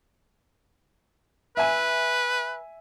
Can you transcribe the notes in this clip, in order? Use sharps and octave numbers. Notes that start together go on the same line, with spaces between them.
B4 E5 G#5